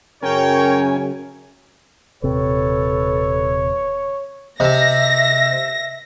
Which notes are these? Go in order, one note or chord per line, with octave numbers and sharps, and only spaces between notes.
F#2 C#3 C#4 A#4 C#5 G5 G#5
D#1 C3 A4 B4 C#5
C3 D#5 E5 A5 A#6